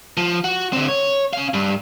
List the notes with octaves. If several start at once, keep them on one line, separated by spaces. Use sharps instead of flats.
F3
F#4
D3 C4
C#5
C#4 F5
G2